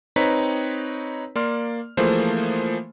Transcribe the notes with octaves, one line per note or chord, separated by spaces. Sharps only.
C4 D#4 B4 C#5 A#5 B6
A#3 D5 C6 F6
E3 F3 A3 A#3 G#4 C5